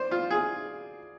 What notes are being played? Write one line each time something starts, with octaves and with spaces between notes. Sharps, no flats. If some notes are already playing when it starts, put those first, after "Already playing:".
Already playing: C5 D5
F4
G#4